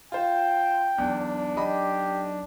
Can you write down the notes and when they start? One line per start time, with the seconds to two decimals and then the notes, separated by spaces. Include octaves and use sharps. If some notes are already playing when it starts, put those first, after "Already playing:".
0.12 F4 C5 G5
0.98 B1 E2 D4
1.57 B1 G4 D#5 B5